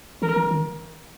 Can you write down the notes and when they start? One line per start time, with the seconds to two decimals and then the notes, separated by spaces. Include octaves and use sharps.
0.22 E3 A#4
0.36 E3
0.51 D#3